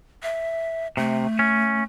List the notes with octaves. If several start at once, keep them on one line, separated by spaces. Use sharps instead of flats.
E5
C3 A3
C#4